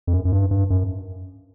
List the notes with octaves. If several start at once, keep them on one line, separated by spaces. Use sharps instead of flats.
F2
F#2
F#2
G2
G2
F#2